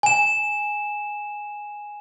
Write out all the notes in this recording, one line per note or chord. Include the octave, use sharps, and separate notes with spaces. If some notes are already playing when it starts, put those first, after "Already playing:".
G#5 E7